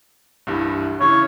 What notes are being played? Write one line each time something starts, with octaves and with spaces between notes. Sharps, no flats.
C2 G2 E3
C#3 E3 C#5